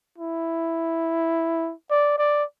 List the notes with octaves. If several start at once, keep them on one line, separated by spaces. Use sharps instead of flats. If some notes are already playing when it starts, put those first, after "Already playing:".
E4
D5
D5